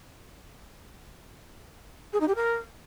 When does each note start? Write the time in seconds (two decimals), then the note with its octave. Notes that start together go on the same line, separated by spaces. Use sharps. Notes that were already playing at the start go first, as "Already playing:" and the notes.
2.13 G#4
2.20 D#4
2.28 G4
2.35 A#4